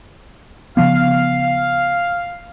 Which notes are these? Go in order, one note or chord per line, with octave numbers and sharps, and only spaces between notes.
C#3 F3 B3 F5